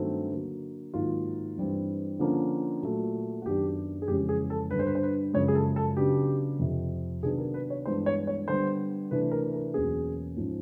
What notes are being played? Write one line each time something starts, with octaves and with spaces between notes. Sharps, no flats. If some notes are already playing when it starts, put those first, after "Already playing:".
Already playing: G2 D#3 F#3 A3 C4
D3 F#3 A#3
G#2 D#3 F#3 A#3 F4
G2 E3 G3 C4
D3 F3 A#3 C#4
A#2 F#3 A3
F#4
F#2 D#3 F#3 B3 D4 G4
G#4
F2 C#3 E3 G#3 C#4 G4
G#4
A4
G2 D3 G3 B4
C5
B4
C5
B4
F#2 C#3 F3 G#3 C#5
G#4
A4
A4
C#3 F#3 B3 D4 G4
F2 C3 F3
C3 D#3 F#3 B3 D4 G#4
A#4
B4
C#5
G2 E3 G#3 B3 D4 C5
C#5
C#5
D3 G3 B3 C5
C3 E3 A3 D4 B4
A#4
A#4
E2 B2 F#3 A#3 C#4 G#4
G#2 F3 G#3 C#4